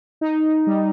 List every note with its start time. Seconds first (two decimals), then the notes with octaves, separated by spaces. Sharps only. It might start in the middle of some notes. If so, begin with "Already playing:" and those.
0.21 D#4
0.67 G3